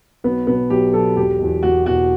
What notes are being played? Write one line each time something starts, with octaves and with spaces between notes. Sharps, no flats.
B1 B3
B2 F#3 B3
B1 G4
B2 F#3 A4
E1 G4
E2 B2
E1 F#4
E2 B2 F#4